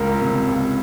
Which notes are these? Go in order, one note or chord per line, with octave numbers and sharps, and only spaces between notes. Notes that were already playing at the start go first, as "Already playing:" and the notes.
Already playing: C#2 A#4
C3
C#2